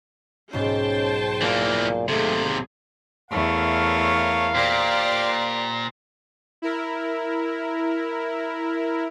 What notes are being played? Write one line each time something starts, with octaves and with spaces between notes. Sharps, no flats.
B1 G#2 C#4 C5 G5 A5
A#2 E3 A#3
D#2 C3 A3 G#4
E2 A3 A#4 C#5 F5
A#2 G4 C5 D5
E4 A#4